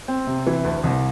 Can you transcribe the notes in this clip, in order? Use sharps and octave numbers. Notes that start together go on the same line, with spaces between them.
C4
C3
E3
D2
C2